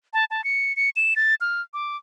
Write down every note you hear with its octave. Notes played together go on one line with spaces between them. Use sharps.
A5
A5
C#7
C#7
E7
A6
F6
D6